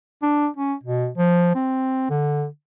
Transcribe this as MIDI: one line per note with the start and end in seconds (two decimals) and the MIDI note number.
0.22 0.48 62
0.57 0.74 61
0.83 1.08 47
1.18 1.55 53
1.55 2.07 60
2.10 2.45 50